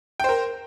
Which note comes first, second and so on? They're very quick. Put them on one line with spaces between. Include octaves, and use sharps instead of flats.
G5 C5 A#4